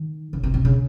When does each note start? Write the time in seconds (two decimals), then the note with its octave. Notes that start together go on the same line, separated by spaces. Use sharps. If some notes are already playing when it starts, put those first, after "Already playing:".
Already playing: D#3
0.33 C#3
0.43 C3
0.54 C3
0.65 C#3